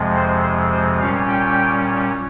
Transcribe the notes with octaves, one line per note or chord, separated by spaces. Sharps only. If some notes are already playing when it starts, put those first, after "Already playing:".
Already playing: F2 C3 F3 G#3
C5
C5
C5
A#2 G3 C#4 F5
G5